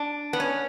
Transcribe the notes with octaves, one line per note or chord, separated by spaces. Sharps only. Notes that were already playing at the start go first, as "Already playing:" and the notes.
Already playing: D4
B3
C#4